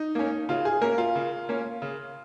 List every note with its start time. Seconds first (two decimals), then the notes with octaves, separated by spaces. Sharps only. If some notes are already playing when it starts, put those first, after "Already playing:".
Already playing: D#4
0.15 A#3 C#4
0.49 C#3 F4
0.65 G#4
0.82 A#3 C#4 A#4
0.98 F4
1.15 C#3
1.49 A#3 C#4
1.82 C#3